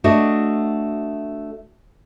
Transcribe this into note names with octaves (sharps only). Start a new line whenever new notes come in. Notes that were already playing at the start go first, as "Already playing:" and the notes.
A3 D4 F#4 D#5